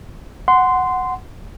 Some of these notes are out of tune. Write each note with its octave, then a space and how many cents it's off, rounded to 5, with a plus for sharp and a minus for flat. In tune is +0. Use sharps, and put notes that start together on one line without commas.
F#5 +0 C6 -15